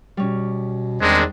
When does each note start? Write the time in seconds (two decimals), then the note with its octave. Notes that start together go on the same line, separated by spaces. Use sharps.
0.17 B2 G3 C#4
1.01 E2 D#3 G#3 C4 D4